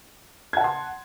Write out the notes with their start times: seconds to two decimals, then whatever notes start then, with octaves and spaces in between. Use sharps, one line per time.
0.53 G#6
0.57 F#5
0.61 A5
0.64 C6